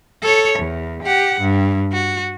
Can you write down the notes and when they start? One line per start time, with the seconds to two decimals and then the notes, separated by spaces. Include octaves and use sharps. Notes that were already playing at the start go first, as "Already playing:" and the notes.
0.22 A4 C#5
0.59 E2
1.03 G4 F#5
1.41 G2
1.93 F#4